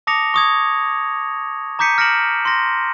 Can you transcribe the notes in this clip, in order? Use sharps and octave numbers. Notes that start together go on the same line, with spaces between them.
A5 D6 D#6 A#6 C#7 F7
C#6 D#6 G#6
A#5 D6 G6 B6 C#7 D#7
F6 A#6 C#7 D7 E7 F#7
C6 A#6